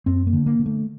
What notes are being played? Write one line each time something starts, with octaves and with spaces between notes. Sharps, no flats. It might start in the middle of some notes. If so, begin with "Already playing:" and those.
F#2 C4
A#3
D3
A#3
D3
A3